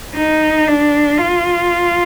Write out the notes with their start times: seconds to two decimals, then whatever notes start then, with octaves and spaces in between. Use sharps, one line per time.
0.15 D#4
0.67 D4
1.18 F4